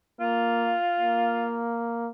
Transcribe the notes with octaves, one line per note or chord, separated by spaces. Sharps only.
A#3 F4
A#3